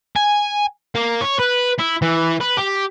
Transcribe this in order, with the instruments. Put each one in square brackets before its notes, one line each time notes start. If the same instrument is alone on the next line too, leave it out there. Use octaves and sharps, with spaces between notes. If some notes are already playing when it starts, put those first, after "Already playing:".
[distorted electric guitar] G#5
A#3
C#5
B4
E4
E3
B4
G4